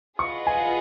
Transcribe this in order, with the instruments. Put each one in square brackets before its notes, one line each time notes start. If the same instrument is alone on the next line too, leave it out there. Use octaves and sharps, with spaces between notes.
[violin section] F4 G#4 B4 D#5 F#5 [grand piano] C#6
[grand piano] G#5